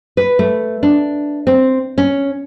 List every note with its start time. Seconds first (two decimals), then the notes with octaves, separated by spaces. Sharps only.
0.17 B4
0.39 A3
0.83 D4
1.47 C4
1.98 C#4